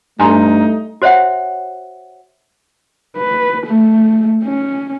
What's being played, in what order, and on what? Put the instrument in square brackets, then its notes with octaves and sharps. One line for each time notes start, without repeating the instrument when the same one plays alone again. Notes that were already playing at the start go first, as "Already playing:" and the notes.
[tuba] G2 [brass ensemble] A3 [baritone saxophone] D#4 [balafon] G#5 A#5 C6
[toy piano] F#4 C5 C#5 E5 F#5
[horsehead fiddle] B4
A3
C#4